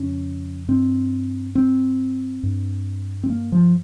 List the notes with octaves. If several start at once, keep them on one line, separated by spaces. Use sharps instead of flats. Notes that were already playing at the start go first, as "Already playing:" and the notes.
Already playing: F2 C#3 C#4
G2 C4
C4
G2
C4
A#3
F3